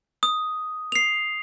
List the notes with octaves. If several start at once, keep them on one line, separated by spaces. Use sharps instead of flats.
D#6
C7 F7